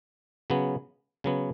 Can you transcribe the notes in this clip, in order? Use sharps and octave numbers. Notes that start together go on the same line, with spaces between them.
C#3 F#3 B3
C#3 F#3 B3